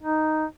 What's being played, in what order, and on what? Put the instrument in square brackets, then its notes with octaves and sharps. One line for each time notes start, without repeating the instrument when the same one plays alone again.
[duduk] D#4